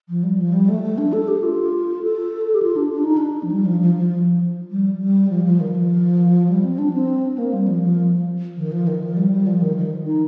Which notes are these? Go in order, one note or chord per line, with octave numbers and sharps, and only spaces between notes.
F3
G3
F3
G3
A3
A3
D4
A4
G4
F4
A4
G4
F4
D4
D4
D#4
D4
F3
G3
F3
F3
F3
G3
G3
F3
F3
D#3
F3
G3
C4
D4
C4
A#3
G3
F3
F3
D#3
F3
D#3
F3
G3
G3
F3
D#3
D#3
D#4